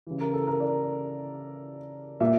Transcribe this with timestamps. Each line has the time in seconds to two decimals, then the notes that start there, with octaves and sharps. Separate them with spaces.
0.07 C#3 E3
0.20 A#4
0.34 A4
0.47 A#4
0.60 D5
2.20 A#2 E5